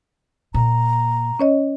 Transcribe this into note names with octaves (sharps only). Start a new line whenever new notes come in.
A#2 A#5
C#4 C#5 D#5